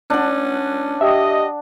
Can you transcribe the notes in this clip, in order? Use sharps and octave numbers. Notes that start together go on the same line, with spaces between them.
C#4 D4 F#5
G4 D#5 E5